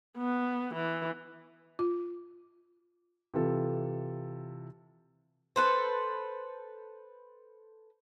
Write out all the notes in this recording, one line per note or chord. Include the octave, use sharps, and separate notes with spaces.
B3
E3
F4
C3 E3 F4 A4
A4 B4 C5